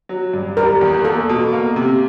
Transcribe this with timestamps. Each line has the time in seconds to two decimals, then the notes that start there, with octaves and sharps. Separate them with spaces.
0.09 F#3
0.33 G2
0.57 G3 A#4
0.81 E2
1.05 A#3 A4
1.29 B2
1.53 A#3
1.76 C3